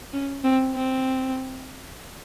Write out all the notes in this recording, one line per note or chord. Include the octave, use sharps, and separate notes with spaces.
C#4
C4
C4